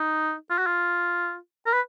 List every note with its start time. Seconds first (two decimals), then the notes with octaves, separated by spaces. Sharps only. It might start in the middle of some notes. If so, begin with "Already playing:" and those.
Already playing: D#4
0.50 F4
0.58 F#4
0.66 F4
1.66 A#4
1.73 B4